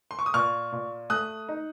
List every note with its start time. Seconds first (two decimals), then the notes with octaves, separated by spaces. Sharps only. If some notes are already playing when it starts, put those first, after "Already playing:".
0.11 C6
0.19 C#6
0.26 D#6
0.34 A#2 C#6 F6
0.72 A#2
1.10 A3 D#6 F#6
1.49 D#4